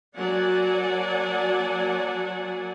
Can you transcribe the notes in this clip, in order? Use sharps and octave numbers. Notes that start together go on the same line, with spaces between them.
F#3 A#3 D5 F#5 G#5 A5